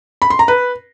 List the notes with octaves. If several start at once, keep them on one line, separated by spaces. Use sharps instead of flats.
B5
C6
A#5
B4